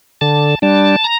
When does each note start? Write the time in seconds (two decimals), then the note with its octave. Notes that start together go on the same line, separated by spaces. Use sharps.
0.21 D3 A5
0.62 G3 D4 A5
1.04 A#5